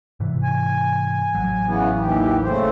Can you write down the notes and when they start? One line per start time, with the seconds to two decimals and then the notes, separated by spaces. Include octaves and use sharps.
0.20 G#2 C3 E3
0.43 G#5
1.35 A1 F#3
1.66 C#3 E3 B3
2.00 D#2 E3 G4
2.44 C#3 A3 C5